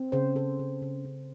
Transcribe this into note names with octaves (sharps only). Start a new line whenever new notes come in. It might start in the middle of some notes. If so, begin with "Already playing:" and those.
Already playing: C4
C#3 C5
C#3 A4
C#3
C#3
C#3